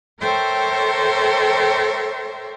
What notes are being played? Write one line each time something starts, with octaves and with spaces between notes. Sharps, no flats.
A4 A#4 C5 C#5 E5 G5